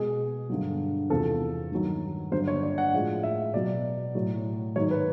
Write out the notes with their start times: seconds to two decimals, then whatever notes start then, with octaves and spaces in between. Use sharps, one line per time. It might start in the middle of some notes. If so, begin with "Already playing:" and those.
Already playing: B2 G#3 G#4
0.50 G2 D3 F#3
1.10 E2 C3 F3 G#3 A4
1.72 G2 D#3 F#3
2.31 G2 D3 F#3 C5
2.47 C#5
2.63 D5
2.78 F#5
2.93 A2 F3 G#3
3.23 E5
3.53 B2 F#3 D5
4.15 A2 F#3
4.76 G#2 D#3 F#3 C#5
4.91 B4